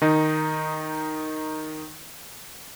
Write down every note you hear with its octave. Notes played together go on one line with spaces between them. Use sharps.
D#3 D#4